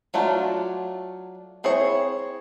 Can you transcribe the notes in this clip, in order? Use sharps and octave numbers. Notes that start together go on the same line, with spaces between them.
F#3 A3 D4 F4
C4 E4 G#4 C#5